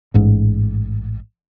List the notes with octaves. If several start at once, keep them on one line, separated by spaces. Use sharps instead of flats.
A1 G#2